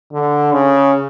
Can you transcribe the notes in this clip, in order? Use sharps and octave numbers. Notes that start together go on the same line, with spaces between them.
D3
C#3